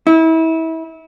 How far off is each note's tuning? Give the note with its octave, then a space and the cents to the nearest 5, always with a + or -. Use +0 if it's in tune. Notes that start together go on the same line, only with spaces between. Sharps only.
E4 -30